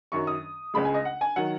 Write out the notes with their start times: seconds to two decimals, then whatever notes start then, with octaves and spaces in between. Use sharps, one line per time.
0.12 F#2 D#3 F#3 C#6
0.27 D#6
0.74 C#2 C#3 G#3 B5
0.85 G#5
0.94 D#5
1.05 F#5
1.21 G#5
1.36 D#3 F#3 F#5